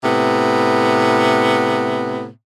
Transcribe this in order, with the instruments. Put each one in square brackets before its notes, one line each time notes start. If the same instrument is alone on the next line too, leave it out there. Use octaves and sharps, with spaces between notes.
[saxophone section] A2 C3 B3